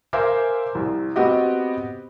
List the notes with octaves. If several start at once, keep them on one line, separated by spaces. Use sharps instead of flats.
A#4 C5 E5 F5 G#5 D6
C2
B3 C4 F#4 G4 D#5